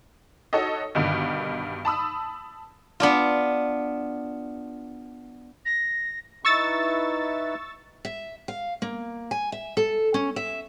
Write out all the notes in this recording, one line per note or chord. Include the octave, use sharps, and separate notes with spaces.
D#4 F#4 A4 C#5 D#5
G2 B2 D3 D#3
A5 B5 D#6 E6
B3 D4 F4
A#6
D#4 E4 B4 C#6 E6 A6
E5
F5
A#3
G#5
E5
A4
C#4
E5